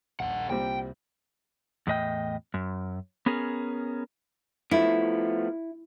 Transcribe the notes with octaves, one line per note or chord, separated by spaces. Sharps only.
D#1 A#1 C#3 F#5
C2 A#2 G3 C4 G5
E2 A2 D#5 G5
F#2
B3 C#4 G#4 A#4
F3 A3 B3 E4